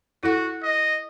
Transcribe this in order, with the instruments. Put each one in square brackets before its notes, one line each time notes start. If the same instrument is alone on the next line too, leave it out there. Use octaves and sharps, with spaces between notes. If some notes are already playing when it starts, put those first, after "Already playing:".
[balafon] E4 A4 F#5 [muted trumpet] F#4
[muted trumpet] D#5